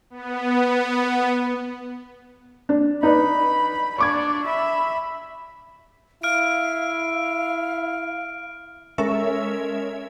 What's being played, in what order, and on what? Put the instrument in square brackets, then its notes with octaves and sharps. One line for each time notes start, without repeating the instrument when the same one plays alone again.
[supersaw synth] B3
[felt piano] D4
[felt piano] D#4 B4 D5 [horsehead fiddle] B5
[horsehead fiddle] D4 D5 [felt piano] C#6 D6 G#6
[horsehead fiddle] E5 B5
[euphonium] E4 [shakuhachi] F5 [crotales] F6 D7
[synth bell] G#3 C#4 A4 A#4 C#5 E5